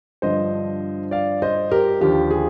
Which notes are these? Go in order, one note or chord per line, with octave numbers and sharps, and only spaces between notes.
G2 D3 F3 C5 D#5
D5 F5
C5 D#5
G4 A#4
D#2 D3 F3 G4
G#4